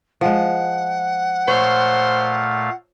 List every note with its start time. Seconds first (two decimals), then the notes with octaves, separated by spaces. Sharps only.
0.21 F3 G#3 F#5
1.48 A#2 A3 C5 C#5 F5